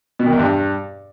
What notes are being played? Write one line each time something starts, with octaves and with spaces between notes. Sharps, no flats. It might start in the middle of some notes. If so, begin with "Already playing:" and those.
B2
D#3
E2
G2